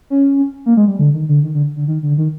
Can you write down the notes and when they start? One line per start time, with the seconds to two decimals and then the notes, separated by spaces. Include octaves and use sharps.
0.10 C#4
0.66 A#3
0.77 G#3
0.88 G3
0.99 D3
1.14 D#3
1.29 D3
1.43 D#3
1.54 D3
1.76 D3
1.88 D#3
2.03 D3
2.18 D#3